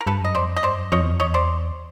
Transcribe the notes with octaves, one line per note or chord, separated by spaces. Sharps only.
A#4
G2 A4 B4
F#2 D#5
F2 C5 D5
D#5
G2 C5 D5
F#2
F2 C#5 D#5
E2
F2
E2 C#5 D#5
C5 D5